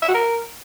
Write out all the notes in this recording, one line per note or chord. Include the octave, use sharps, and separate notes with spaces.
E5
F#4
A#4